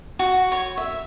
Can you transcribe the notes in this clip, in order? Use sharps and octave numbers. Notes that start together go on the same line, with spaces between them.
F#4
C#5
E5